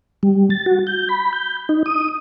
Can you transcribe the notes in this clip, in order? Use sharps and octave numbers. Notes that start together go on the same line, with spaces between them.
G3
A6
F#4
G6
B5
G6
D#4
D#6